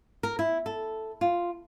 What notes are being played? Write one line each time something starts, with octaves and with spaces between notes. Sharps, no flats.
A#4
E4
A4
F4